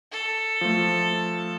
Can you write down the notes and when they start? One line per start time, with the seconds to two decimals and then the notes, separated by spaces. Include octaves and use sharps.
0.12 A4
0.61 F3 A3